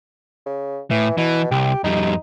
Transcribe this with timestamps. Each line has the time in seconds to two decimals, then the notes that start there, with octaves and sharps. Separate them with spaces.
0.46 C#3
0.90 A2 E3
1.18 B2 E3
1.51 C2 G4
1.84 F2 G3 D#4